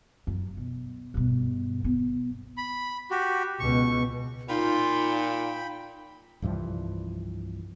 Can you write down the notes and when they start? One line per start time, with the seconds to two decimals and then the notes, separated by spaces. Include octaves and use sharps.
0.27 F#2
0.57 B2
1.14 G2 B2
1.84 B3
2.57 B5
3.11 F#4 G4
3.60 C#2 B2 C#6
4.49 A#2 D#4 F4 G5 B5
6.42 C2 G2 E3 F3